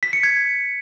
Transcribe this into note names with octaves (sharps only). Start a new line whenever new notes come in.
B6
C#7
G#6